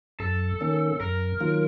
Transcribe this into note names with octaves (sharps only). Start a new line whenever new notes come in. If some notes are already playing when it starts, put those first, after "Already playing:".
F#2 A4
D#3 A#3 C#4
F#2 A#4
D#3 F#3 A#3 F4